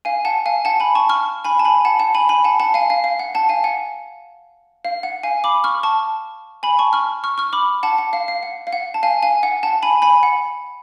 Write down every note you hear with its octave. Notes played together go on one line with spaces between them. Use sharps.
F5 G#5
F#5 A5
F5 G#5
F#5 A5
G#5 B5
A5 C#6
C#6 F6
G#5 B5
A5
G#5 B5
F#5 A5
F#5 A5
G#5 B5
G#5 B5
F#5 A5
F#5 A5
F5 G#5
F5
F5
F#5
F#5 A5
F5 G#5
F#5
F5
F#5
F5 G#5
B5 D6
C#6 F6
A5 C#6
G#5 B5
A5 C#6
C#6 F6
C#6 F6
C#6 F6
B5 D6
F#5 A5
F#5
F5
F5
F#5
F5
F#5
A5
F5 G#5
F5 G#5
F#5
F#5 A5
G#5 B5
G#5 B5
F#5